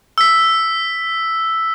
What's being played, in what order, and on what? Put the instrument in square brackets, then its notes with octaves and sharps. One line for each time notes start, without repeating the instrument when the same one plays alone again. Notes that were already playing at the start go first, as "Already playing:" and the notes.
[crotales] E6 B6